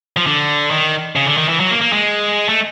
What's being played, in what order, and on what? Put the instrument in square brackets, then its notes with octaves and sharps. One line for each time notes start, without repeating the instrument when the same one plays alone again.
[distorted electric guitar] F3
D3
D#3
C#3
D3
D#3
E3
F#3
A#3
A#3
G#3
A3